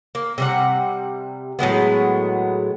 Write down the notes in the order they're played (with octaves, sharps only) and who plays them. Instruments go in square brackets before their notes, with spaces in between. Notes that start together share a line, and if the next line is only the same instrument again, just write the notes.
[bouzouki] A#3
C3 G3 F#5
A2 F#3 G#3 B3